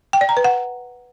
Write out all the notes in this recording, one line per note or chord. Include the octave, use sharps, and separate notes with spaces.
G5
D5
A#5
B4
F#5